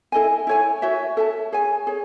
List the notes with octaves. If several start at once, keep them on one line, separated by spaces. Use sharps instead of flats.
E4 A4 D#5 G#5
E4 A4 C#5 G#5
F#4 C#5 E5
A4 E5 A5
G#4 C#5 G#5
G#4 C#5